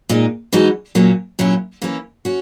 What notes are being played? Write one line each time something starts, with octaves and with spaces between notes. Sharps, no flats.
A#2 G#3 D#4
E3 G#3 D#4 F#4
A#2 F#3 A#3 C#4
A#2 F#3 C#4 E4
E3 A#3 C#4 E4
C#4 F#4